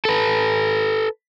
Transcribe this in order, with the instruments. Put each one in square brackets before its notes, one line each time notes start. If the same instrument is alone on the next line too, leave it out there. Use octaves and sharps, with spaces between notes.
[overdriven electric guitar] A4 B4